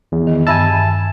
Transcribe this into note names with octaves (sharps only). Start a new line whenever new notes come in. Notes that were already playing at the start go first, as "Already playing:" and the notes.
E2
D#3
G2 E5 G#5 A5 E6